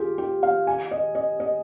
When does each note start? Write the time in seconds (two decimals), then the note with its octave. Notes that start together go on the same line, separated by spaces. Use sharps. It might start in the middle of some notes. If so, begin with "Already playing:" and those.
Already playing: F4 G4 G#4
0.18 G4
0.43 F5
0.67 G#5
0.91 D#5
1.15 D#5
1.40 D#5